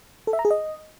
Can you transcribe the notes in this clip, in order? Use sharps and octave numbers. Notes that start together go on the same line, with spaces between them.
A4
E5
A#5
G#4
D#5